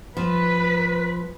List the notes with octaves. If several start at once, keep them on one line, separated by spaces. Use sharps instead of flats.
F3 B4